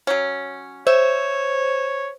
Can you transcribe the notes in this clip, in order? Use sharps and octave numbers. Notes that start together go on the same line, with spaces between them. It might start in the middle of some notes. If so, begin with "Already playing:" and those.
F#3 C#4
C5 C#5 E5